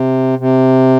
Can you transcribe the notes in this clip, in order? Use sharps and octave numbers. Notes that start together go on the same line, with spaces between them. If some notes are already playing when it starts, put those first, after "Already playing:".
Already playing: C3
C3